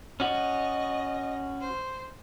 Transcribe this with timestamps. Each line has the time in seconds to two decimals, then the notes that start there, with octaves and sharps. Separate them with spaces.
0.20 C#4 F#4 D#5
1.60 C5